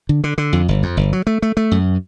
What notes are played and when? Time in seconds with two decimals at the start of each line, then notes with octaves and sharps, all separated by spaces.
0.09 D3
0.24 D3
0.38 D3
0.53 F2
0.68 G1
0.83 F2
0.97 G1
1.13 F#3
1.27 A3
1.42 A3
1.57 A3
1.71 F#2